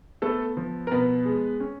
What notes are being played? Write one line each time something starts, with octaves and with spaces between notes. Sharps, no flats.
A3 B3 A4
F3
A#4
B2 B3 B4
G#3
C#4